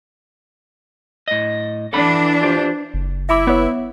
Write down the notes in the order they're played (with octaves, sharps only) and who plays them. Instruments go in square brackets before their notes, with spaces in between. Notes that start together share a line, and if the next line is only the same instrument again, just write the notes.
[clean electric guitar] A2 D#5
[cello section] E3 D4 [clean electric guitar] A4 F#5 B5
[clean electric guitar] F4 G4 C5
[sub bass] F#1
[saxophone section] E4 [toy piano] E5 B5 D6
[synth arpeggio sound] B3 C#5